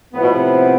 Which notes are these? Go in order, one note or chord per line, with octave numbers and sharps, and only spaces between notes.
A2 F3 B3
B2
C3